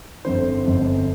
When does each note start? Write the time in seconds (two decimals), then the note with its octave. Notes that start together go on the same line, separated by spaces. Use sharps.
0.24 G1 F2 D3 C5
0.64 G1 F2 D3